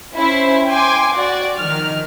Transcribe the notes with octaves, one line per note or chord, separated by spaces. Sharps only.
C#4 E4 C5
G5 G#5 C6 D6
F#4 D5
D#3 F3 F6